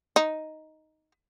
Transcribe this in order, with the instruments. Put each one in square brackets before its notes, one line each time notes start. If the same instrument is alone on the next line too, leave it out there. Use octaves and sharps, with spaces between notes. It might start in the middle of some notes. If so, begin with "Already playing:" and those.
[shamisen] D#4